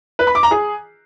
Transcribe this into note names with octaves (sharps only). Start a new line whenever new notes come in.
B4
B5
D6
A#5
G#4